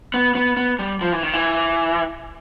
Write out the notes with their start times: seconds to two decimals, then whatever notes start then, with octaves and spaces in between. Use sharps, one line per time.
0.14 B3
0.35 B3
0.57 B3
0.79 G3
1.01 F3
1.12 E3
1.23 D#3
1.33 E3